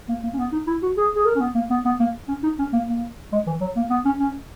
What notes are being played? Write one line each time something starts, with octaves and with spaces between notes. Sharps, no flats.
A#3
A#3
C#4
B3
D#4
E4
F#4
G#4
G#4
A#4
C#4
B3
A#3
B3
B3
A#3
C#4
D#4
C#4
A#3
A#3
G#3
E3
F#3
A#3
B3
C#4
C#4